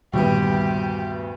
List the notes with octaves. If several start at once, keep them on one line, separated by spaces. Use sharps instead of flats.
D2 G2 A#2 D#3 G3 B3 G4